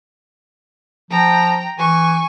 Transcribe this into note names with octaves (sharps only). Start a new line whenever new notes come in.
F3 G5 A#5
E3 G#5 C#6